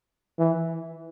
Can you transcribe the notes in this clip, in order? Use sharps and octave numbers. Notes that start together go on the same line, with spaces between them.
E3